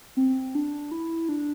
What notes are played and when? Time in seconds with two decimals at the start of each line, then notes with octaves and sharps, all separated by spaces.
0.17 C4
0.55 D4
0.91 E4
1.29 D4